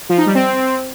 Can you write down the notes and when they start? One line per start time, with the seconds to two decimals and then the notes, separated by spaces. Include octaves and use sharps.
0.09 F3
0.18 D#4
0.26 G3
0.35 C4